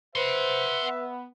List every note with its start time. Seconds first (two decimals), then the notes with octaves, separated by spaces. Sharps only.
0.15 B4 C5 E5 F#5 C6
0.83 B3